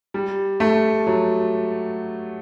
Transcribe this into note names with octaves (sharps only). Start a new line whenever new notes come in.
G3
A3
F#3